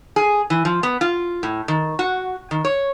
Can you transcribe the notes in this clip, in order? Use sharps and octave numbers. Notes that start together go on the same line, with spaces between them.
G#4
E3
F3
B3
F4
A2
D#3
F#4
D#3
C#5